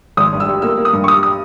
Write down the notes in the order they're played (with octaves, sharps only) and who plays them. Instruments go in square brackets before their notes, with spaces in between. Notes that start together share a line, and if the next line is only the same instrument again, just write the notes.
[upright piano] G#1 D#6
G2
E6
G3
A#3 E6
A#3
D#6
G2
C#6
G3 D#6
D#6